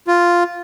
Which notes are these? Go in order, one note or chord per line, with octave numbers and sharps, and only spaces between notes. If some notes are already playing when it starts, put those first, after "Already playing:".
F4